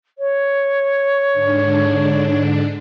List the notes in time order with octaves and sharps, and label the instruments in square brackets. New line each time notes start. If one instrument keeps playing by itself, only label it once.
[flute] C#5
[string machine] G#2 D3 D4